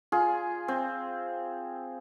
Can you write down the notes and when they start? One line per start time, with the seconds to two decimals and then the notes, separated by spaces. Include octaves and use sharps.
0.12 F4 G#4
0.68 C4